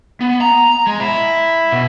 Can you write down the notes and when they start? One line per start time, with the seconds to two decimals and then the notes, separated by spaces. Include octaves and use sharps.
0.21 B3
0.41 A#5
0.87 G#3
1.00 E4
1.72 B2